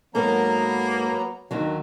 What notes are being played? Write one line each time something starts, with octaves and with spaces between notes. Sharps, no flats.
G#2 F#3 A#3 B3 A4 A#4 A#5
D#2 D3 D#3 F#3